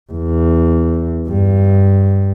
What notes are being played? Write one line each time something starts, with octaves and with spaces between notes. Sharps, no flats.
E2
G2